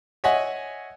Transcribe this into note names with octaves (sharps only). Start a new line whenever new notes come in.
C#5 D#5 E5 F#5 G#5